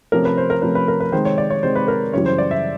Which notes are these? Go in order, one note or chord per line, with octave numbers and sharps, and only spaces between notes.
C3 F3 A3 C#4 A#4
B4
C5
A#4
C3 F3 A3 C#4 B4
B4
A#4
B4
C3 D#3 G#3 C5
C#5
D5
C#5
C3 D#3 G#3 C5
B4
A#4
F#2 C#3 E3 G3 C#5
C5
D5
E5